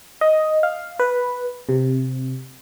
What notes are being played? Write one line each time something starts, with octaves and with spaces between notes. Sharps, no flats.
D#5
F5
B4
C3